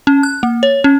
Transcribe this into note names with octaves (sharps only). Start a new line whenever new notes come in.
C#4
F#6
A#3
C#5
C#4